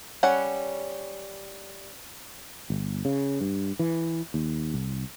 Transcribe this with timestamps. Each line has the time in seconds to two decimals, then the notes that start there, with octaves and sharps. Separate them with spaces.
0.23 G3 C#4 F#5
2.70 G1
3.05 C#3
3.41 G2
3.79 E3
4.34 D#2
4.74 C2